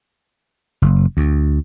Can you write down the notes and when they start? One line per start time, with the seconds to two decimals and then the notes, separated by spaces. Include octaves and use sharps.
0.82 F#1
1.17 D2